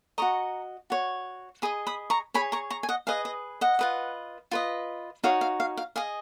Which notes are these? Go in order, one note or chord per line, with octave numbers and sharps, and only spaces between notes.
F#4 A#4 D#5 A#5 C#6
F#4 C#5
G#4 D#5 B5 D#6
B5 D#6
A#5 C#6
G#4 C#5 G#5 B5
A#5 C#6
A#5 C#6
G#5
D#5 F#5
G#4 B4 D#5 F5
D#5
D#5 F#5
F4 B4 D#5
F4 B4 D#5
D#4 F#4 C#5 F5
F5
F5
F5
G#4 D#5 F5